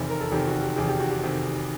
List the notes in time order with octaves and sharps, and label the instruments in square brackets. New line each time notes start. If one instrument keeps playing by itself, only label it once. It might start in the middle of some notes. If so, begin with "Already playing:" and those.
Already playing: [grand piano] F1 E2 C3 D#3
A#4
A4
F1 E2 C3 D#3 G4
F#4
G4
F1 E2 C3 D#3 G#4
G4
F#4
G4
C3 D#3